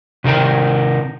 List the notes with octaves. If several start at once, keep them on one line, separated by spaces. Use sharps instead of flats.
C3 D#3 A#4 G5